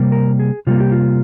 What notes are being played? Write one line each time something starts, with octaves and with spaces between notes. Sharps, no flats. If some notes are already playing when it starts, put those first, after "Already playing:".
Already playing: C3 G3 A#3
A#4
G#4
C3 G3 A#3 F4
G4
F4